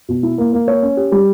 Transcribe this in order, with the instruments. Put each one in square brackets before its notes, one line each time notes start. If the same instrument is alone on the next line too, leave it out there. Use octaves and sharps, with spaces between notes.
[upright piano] B2
E4
A#3
A#3
C#5
C#4
G4
G3